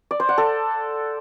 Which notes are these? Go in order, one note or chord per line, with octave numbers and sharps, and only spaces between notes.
D5
C5
F#5
A4